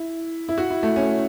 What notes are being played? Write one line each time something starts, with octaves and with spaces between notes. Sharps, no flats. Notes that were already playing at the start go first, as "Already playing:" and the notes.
Already playing: E4
E4
F#4
E4
A3
C#4